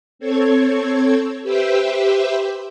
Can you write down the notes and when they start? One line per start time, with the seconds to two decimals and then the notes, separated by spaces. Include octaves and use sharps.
0.19 C4 A4 C#5 G#6
1.43 G4 B4 C5 E5 G5